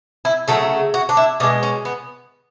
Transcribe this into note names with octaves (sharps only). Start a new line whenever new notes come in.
E4
C#3 F#3 A3 A4
F#4
D4
E4
B2 G#3 D4
C#4
B3